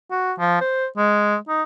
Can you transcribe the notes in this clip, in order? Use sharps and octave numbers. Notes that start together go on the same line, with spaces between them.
F#4
F3
C5
G#3
D#4